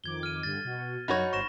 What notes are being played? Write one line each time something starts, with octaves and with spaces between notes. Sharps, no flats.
F2 D#3 D6 G#6 G7
F6 D#7
G2 D3 A6
B2 F#4
F#2 F#3 D#4 F#4 C#5 B5
G1 C5 C#6 A#6 E7